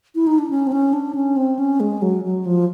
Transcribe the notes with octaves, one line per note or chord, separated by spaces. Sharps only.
E4
D#4
D4
C#4
C4
C#4
D4
C#4
C4
C#4
G#3
F#3
F#3
F3